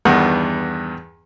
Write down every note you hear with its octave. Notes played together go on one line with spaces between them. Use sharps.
E2 G2 D#3 B3 F#5 F#6